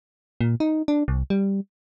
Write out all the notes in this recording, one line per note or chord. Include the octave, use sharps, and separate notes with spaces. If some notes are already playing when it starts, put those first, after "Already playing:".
A#2
D#4
D4
C2
G3